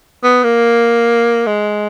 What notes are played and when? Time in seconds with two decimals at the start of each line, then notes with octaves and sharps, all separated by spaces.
0.24 B3
0.44 A#3
1.47 G#3